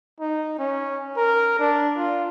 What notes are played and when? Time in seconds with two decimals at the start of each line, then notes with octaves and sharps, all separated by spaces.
0.20 D#4
0.59 C#4
1.17 A#4
1.59 D4
1.97 F4